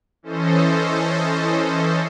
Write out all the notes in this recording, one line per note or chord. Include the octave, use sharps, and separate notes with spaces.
E3 C#4 A4 C5 D#5